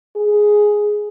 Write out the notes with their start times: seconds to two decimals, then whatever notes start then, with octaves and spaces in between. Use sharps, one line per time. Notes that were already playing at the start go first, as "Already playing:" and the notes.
0.16 G#4